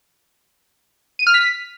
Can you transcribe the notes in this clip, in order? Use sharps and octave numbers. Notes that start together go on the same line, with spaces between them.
D#7
F6
B6